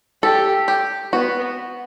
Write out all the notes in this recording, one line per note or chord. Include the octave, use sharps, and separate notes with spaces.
G4 A4
G4
B3 F#4